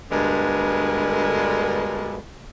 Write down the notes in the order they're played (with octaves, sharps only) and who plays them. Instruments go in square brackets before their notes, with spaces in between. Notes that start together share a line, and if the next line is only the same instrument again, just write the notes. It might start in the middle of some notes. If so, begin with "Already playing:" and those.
[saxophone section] D2 G2 D3 G#3 B3 A#4